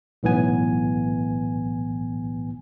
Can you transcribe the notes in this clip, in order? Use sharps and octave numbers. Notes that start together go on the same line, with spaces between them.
B1 A2 E3 B3 G#5